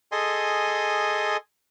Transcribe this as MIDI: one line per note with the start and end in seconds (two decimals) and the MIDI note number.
0.12 1.37 68
0.12 1.37 69
0.12 1.37 75
0.12 1.37 80
0.12 1.37 84